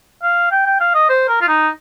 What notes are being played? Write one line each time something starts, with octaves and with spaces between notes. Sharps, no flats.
F5
G5
G5
F5
D#5
C5
A#4
F4
D#4